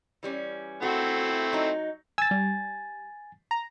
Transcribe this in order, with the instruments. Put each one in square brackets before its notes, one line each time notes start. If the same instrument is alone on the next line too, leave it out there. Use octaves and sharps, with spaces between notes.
[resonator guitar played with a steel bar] E3 G3 C#4
[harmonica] A3 C4 E4 [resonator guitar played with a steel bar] F#4
[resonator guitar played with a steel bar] F#3 D#4
[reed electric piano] G#5 A6 [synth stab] E6
[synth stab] G3
A#5